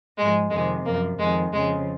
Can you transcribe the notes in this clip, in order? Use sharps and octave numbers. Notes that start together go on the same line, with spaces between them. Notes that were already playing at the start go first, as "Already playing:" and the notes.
G#2 F3 G#3
F2 C3 D#3 G#3
F#2 F3 A#3
F2 D#3 G#3
F2 C#3 F3 G#3